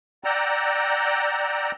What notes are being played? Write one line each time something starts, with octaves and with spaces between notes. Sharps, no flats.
D5 F#5 G5 A#5 E6